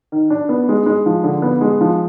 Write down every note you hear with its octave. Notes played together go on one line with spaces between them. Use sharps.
D#3
D4
B3
G#3
G#3
F3
D3
B3
G#3
F3